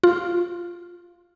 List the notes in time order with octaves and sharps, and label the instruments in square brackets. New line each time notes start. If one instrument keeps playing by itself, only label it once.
[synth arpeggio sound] F4